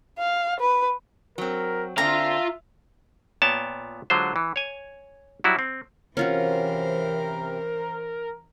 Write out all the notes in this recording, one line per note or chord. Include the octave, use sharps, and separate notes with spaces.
F5
B4
F#3 C4 A#4
D3 C4 D4 F4 E5 F5 A#5
A#2 B3 C#5 G5 A5
D3 F#3 G#3 F4 C5
E3
C#5 G#5
F#3 G3 E4 F#4
C4
C3 E3 C4 C#4 F4 F#4 A#4 C5